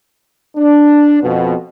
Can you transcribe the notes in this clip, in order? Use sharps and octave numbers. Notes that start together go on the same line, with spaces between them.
D4
F2 B2